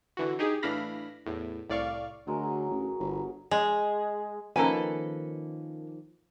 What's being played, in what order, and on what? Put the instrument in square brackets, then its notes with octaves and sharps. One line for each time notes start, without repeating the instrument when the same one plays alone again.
[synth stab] D3 E3 F#4
D#4 G4 G#4
A2 E3 D4 F5 B5 A#6
E2 A2
C2 A2 D5 F5 C#6
[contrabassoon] D2 [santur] F#3 G#3 A#4
[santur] F#3 G#4
[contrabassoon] A1
G1
[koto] G#3
[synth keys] D#3 F3 [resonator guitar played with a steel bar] A#3 C#4 B4 [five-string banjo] A4 G#5